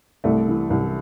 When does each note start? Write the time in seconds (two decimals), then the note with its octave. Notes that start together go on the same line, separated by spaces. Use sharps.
0.24 C2 A3
0.48 E3
0.70 C2